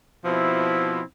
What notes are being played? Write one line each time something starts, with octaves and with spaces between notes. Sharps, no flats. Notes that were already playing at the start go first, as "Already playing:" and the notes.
B2 F3 C4 E4